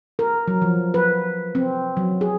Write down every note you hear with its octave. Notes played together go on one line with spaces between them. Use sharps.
A#4
F#3
F3
B4
C4
F#3
G#4